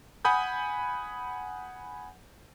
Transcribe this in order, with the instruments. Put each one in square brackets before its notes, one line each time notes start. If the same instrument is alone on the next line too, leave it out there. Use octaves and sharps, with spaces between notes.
[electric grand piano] F#5 G#5 B5 D#6 G6